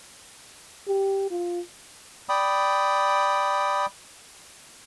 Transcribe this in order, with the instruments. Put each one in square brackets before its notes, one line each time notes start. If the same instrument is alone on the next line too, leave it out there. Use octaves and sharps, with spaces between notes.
[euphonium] G4
F4
[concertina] D5 G5 B5 D#6